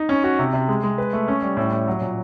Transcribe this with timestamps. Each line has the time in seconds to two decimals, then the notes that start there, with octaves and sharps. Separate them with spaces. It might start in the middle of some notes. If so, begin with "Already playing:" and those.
Already playing: D#4
0.09 C#4
0.24 F#4
0.39 C3
0.53 C3
0.68 G#3
0.83 G#3
0.98 B4
1.13 A3
1.28 C#4
1.42 G3
1.57 A2
1.72 A2
1.87 F#3
2.01 A#2